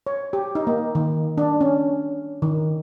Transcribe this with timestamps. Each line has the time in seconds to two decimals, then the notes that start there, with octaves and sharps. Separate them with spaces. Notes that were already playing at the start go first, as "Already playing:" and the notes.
0.07 C#5
0.33 G4
0.55 D#4
0.67 A#3
0.95 D#3
1.38 D4
1.61 C#4
2.42 D#3